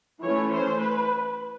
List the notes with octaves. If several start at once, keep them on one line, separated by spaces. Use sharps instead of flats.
E3 A3 C#4 C#5
C5
B4